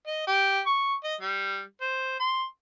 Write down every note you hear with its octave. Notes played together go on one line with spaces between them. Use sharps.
D#5
G4
C#6
D#5
G3
C5
C6